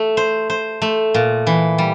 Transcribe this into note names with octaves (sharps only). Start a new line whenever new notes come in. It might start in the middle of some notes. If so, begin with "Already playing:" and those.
Already playing: A3
C5
C5
A3
A#2
E3
G3